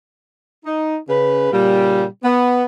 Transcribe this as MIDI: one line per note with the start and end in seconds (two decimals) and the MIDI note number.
0.65 0.97 63
1.09 1.51 49
1.09 1.51 71
1.52 2.05 46
1.52 2.05 49
1.52 2.05 55
2.24 2.64 59